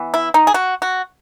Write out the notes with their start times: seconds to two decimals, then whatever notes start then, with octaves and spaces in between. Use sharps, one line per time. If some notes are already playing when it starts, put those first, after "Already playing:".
Already playing: E3 B3
0.14 E4
0.34 D#4
0.47 G#4
0.54 F#4
0.82 F#4